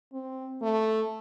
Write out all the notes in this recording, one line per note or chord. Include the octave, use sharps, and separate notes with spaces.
C4
A3